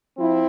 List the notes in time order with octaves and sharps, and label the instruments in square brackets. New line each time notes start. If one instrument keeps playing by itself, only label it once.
[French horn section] F3 C4 E4